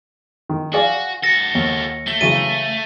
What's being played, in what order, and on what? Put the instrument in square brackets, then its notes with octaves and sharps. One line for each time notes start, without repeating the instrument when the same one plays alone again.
[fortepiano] D#3
[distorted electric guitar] F#4 [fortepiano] G#4 D5 F5
[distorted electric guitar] F#4 A4 [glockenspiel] A#6 C#7
[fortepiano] D#2
[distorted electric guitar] A3 [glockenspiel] G7
[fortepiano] C#3 E3 F#3 [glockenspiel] D#7